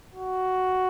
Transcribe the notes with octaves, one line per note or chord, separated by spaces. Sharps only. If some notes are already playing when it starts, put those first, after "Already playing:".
F#4